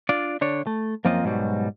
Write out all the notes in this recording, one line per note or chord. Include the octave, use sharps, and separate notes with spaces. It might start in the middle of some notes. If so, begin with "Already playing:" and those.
D4 F4 D5
D3 D4 C#5
A3
F#2 F3 A#3 C4 F4 D#5
G#2 B2 F#3 G3